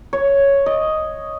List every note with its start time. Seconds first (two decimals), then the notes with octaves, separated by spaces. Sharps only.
0.13 C#5
0.66 D#5